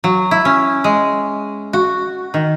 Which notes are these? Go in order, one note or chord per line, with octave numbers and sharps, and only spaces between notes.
F#3
E4
C#4
G#3
F#4
D#3